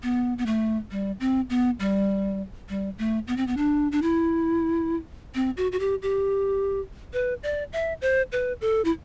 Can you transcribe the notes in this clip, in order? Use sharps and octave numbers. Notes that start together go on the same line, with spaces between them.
B3
B3
A3
G3
C4
B3
G3
G3
A3
B3
C4
B3
D4
D4
E4
C4
F#4
F#4
G4
G4
B4
D5
E5
C5
B4
A4
E4